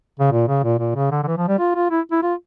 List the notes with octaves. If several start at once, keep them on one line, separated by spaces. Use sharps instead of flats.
C#3
A#2
C#3
A#2
A#2
C#3
D3
D3
E3
F3
G3
F4
F4
E4
E4
F4